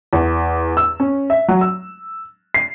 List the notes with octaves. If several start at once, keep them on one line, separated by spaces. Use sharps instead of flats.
E2
E6
C#4
E5
F#3
E6
C7